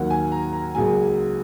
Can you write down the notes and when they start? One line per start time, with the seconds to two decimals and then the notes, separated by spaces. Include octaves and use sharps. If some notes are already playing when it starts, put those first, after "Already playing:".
Already playing: D#2 D#3 F#3 A#3 F#5
0.10 G#5
0.32 A#5
0.53 A#5
0.75 C#2 C#3 F#3 A#3 G#5